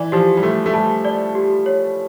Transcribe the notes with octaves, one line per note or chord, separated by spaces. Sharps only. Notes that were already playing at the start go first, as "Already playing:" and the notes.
Already playing: E3 D5
F3 G4
G3
A3 G4
A3
G3 A5
D5
G4
C#5